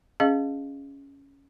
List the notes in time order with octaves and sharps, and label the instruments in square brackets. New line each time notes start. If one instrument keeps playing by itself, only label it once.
[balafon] C#4 G#4 D#5 F5